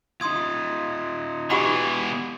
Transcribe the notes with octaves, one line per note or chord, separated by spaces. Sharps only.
D#4 F4 C6 D#6 G#6
B2 E3 G4 F#5 B5